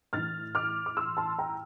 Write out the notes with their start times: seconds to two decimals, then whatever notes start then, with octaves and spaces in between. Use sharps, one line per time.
0.13 A2 E3 F6 A6
0.55 D6 F6
0.86 D6
0.97 C6 E6
1.17 A5 C6
1.39 G5 A#5